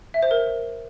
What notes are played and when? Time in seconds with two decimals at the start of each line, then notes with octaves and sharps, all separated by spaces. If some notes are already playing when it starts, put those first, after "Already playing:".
0.14 E5
0.23 C5
0.31 A#4